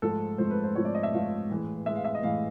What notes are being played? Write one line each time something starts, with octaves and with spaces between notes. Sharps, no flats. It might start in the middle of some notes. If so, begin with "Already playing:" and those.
G#2 F3 A3 A4
G#2 F3 A3 C5
B4
C5
G#2 F3 A3 C#5
D5
D#5
E5
G#2 F3 A3 F5
A2 E3 G#3
A2 E3 G#3 E5
F5
E5
D#5
A2 E3 G#3 F5